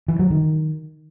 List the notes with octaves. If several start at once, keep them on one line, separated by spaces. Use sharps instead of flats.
E3
F#3
D#3